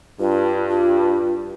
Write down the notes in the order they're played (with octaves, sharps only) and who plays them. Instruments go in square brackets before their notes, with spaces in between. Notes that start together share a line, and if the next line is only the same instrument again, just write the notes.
[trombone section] G2 [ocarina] F4
[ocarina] F4